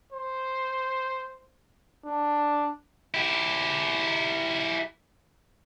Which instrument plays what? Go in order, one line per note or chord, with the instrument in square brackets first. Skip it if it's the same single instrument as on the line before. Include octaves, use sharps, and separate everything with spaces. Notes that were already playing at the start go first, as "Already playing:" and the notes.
[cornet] C5
D4
[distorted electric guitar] E4 G4